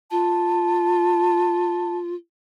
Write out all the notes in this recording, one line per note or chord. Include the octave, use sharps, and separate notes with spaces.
F4 A5